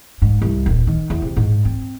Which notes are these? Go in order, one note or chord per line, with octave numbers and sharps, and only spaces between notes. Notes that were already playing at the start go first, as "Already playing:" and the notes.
G#2
C2
D#1
D#3
E2
C3
G#2
C4